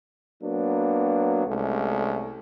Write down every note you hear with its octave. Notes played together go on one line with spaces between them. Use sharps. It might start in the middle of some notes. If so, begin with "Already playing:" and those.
F#3 A#3 B3 D4
C2 G#3 A3 C#4